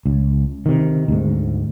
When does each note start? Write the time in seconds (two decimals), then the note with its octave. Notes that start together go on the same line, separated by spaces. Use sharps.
0.06 C#2
0.66 C3 D#3
1.08 D2 G#2